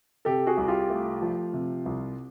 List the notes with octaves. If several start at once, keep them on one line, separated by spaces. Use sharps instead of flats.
C3 G4 A4
F#4 G#4
C2
F4 G4
A3
F3
C3
C2